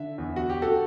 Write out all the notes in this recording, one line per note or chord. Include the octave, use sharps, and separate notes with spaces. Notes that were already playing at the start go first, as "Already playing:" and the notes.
Already playing: D3 E5
E2
F#4
G4
F#4 A4